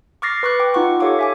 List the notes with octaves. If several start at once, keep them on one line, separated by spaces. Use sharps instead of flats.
C#6 D6 F6 A6 A#6 C7
B4 C#6 D6 F#6
G5 D6
D#4 F4 F#5 C#6
G4 A4 C#5 F5 C#6 D6
E5 G#5 D6